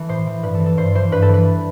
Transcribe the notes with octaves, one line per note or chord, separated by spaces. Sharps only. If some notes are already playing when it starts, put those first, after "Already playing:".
Already playing: E3 A4
A2 C5
E3
G2 B4
A4
E3
A4
G2 C5
E3 C5
G2 B4
A4
E3
B4